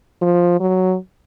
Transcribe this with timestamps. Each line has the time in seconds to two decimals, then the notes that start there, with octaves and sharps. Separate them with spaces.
0.22 F3
0.60 F#3